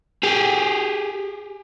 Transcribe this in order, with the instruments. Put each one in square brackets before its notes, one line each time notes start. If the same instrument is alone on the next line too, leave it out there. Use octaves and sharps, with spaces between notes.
[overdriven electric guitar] G4 G#4